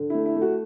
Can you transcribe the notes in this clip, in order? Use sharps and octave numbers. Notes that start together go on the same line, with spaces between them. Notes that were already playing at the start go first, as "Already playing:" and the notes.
Already playing: D3
A3 E4
E4
A3
F#4